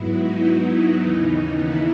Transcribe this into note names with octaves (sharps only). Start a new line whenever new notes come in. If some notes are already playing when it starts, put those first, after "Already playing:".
Already playing: G#2 F#3 B3 E4
D#4
D#4
D#2 C#3 E3 B3
E4